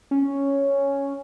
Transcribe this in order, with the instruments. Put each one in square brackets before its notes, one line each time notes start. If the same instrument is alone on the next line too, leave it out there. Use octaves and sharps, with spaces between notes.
[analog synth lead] C#4